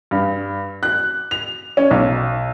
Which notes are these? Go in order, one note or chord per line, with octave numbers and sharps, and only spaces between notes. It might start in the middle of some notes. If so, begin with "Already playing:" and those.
G2
F#6
F7
C#4
B1